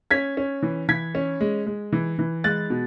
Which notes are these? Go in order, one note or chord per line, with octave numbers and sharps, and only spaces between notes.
C#4 G#6 B6
C#4
E3
E3 G#6 B6
C#4
G#3
G#3
E3
E3
G#3 F#6 A6
B2